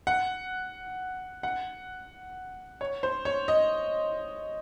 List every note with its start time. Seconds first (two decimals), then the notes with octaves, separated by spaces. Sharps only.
0.07 F#5
1.43 F#5
2.81 C#5
3.03 C5
3.25 C#5
3.48 D#5